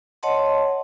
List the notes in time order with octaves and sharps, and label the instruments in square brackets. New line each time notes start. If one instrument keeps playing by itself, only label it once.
[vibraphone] C#5 D#5 F#5 A5 C6